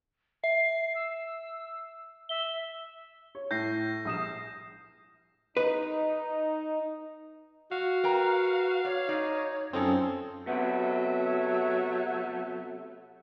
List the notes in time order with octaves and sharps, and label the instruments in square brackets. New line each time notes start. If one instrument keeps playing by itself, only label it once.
[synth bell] E5 [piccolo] C7
[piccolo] E6
[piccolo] E5 [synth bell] G7
[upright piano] C#5
[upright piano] A2 [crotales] G6 A#6 C7
[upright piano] A#1 D#6 E7
[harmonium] D#4 [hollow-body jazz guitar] B4
[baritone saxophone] F#4 [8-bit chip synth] F5
[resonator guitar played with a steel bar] A#4 G5 A#5 [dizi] B4
[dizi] C#5 [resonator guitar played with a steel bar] D5
[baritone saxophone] D#4 [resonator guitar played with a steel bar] D5
[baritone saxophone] F#2 [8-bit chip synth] C4 [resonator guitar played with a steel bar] C#4 D#4 F4 [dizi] A4
[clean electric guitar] C3 B3 [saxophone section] F#3 A3 E5